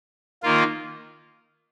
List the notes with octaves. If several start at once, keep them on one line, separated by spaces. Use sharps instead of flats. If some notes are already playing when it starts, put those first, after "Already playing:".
D#3 A#3 F4